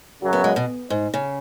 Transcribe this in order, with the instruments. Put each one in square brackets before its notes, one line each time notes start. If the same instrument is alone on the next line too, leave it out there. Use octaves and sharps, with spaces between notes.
[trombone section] F#2 C#3 F#3
[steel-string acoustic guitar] B3
G#3
B2
G#2
C#3